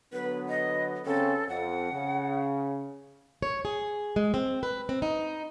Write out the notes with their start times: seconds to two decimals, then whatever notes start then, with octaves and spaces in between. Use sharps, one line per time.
0.13 D3 F#3 B3 B4
0.49 D#5
1.06 C#3 C4 C#4 A4
1.49 F2 F#5
1.92 C#3
3.42 C#5
3.65 G#4
4.16 G#3
4.34 C4
4.63 B4
4.89 C4
5.02 D#4